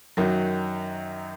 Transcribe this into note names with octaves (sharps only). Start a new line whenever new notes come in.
F#2 D#3 F#3